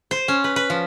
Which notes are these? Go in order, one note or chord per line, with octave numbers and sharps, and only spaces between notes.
C5
C#4
B4
B4
F3